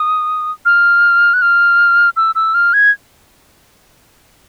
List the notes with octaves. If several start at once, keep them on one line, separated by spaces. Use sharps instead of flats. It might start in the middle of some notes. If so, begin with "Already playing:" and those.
Already playing: D#6
F6
F#6
F6
E6
E6
F6
G#6